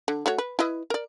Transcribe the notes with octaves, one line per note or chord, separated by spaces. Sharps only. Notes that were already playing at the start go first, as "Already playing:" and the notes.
D3
A3 F#4 C#5
B4
E4 B4 D#5
A#4 D5